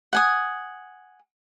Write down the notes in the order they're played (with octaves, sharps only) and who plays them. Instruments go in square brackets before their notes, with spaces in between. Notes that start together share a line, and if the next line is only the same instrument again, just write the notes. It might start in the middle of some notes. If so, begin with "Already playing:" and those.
[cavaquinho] F#5 G#5 D#6